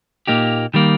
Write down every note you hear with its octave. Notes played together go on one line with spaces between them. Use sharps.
A#2 A#3 D#4 G4
D#3 G3 A#3